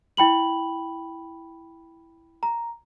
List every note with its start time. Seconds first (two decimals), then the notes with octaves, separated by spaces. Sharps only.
0.17 E4 G5 B5 F#7
2.43 A#5